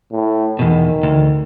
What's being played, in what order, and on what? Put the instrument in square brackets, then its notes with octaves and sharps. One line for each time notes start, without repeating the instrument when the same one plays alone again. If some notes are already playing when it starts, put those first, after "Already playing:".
[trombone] A2
[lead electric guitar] E2 B2 [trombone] D#3
[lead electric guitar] D2